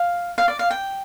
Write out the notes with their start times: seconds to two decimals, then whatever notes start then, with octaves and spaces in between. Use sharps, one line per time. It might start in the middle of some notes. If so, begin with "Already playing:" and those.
Already playing: F5
0.38 F5
0.48 D5
0.59 F5
0.71 G5